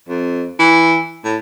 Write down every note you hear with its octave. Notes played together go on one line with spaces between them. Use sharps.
F2
E3
A2